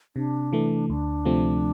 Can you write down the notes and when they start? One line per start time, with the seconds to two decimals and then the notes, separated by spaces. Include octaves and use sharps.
0.16 C3 D4
0.53 E3 A3
0.90 D2 D4
1.25 C3 F3 A3 C4